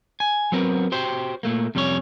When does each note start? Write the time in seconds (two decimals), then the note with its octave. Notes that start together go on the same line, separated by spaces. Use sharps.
0.20 G#5
0.52 F#3 B3 C4 A#4
0.92 F#4 G4 C5 G5
1.43 A#2 A3 A#3
1.75 F2 C3 G3 C#4 E4 C#5